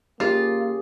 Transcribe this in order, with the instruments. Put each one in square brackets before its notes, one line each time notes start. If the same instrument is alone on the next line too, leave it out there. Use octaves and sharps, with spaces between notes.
[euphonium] A#3 [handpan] C#4 G4 G#4 [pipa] F4